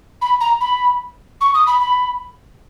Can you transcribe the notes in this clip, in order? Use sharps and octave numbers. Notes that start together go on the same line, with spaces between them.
B5
A#5
B5
C#6
D#6
B5
B5